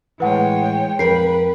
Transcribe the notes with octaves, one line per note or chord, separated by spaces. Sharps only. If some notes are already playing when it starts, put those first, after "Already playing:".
A2 E3 G#3 B4 C#5 F#5 G5
F2 A#4 B4 G5 C7